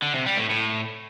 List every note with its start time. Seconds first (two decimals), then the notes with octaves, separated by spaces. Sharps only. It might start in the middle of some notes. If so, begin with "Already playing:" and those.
0.02 D3
0.14 C3
0.26 G3
0.38 A2
0.50 A2